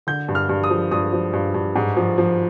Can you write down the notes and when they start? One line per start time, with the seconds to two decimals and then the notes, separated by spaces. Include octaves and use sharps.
0.07 D3 G6
0.28 G2
0.35 F6
0.49 G2
0.64 D#6
0.70 F3
0.91 G2 D#6
1.13 F3
1.33 G2
1.54 G2
1.75 G#2
1.97 F3
2.18 F3